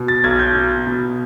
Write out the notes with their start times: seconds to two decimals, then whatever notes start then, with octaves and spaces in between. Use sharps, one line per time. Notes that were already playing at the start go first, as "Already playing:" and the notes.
Already playing: B2
0.08 A6
0.24 B1 G#6
0.39 G6
0.55 B2
0.87 B2